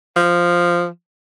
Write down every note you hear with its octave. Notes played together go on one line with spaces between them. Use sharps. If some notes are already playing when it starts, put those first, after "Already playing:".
F3